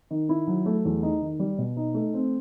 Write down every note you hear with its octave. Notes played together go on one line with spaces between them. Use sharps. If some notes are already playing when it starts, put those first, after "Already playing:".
D#3
E4
F#3
A3
E2
D#4
D#3
G3
B2
D#4
A3
C4